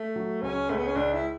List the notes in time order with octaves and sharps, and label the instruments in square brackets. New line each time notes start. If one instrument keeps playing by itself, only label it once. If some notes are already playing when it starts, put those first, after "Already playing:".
Already playing: [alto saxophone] A3
[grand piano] F#3
[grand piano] C#2 [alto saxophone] C#4
[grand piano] C#2 [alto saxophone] A3
[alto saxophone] B3
C#4
[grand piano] C#2 [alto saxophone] D4
[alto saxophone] E4